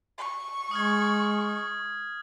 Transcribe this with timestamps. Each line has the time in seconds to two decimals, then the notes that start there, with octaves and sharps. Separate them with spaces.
0.18 C#6
0.71 G#3 D#6 F6 G#6